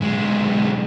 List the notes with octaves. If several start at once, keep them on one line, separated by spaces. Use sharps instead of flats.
B1 G#3